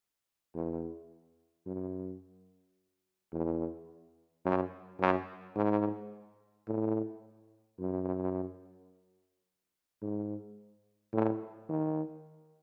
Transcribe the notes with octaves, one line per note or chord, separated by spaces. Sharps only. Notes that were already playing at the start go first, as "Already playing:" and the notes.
E2
F#2
E2
F#2
F#2
G#2
A2
F#2
G#2
A2
D#3